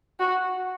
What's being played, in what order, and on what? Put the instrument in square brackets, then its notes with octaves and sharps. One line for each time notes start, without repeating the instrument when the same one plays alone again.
[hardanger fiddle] F#4